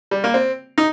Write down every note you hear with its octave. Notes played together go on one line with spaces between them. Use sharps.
G3
A#3
C4
D#4